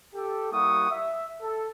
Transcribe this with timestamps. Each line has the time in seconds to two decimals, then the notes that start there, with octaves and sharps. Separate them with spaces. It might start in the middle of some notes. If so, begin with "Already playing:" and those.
0.14 G4 A4
0.51 G3 A#3 E4 F#5 C#6 D#6
0.90 E5
1.42 A4